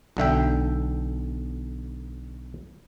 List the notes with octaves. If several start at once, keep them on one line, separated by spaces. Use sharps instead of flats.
B1 D3 E5 G5